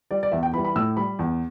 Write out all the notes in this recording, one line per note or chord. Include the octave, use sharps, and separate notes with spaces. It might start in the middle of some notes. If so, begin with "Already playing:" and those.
G3 D5
D5
E2 E5
G5
E3 G3 B5
B5
A2 E6
G3 B5
E2